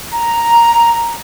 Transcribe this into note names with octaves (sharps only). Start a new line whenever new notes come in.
A#5